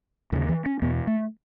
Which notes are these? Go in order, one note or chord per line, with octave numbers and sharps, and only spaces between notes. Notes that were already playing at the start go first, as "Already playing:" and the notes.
D#2 C#3 D#3
E3
C#4
E2 B2 B3
A3